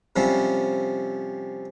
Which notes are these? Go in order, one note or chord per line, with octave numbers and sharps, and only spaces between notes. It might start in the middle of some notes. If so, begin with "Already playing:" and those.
C3 F3 G3 C4 C#4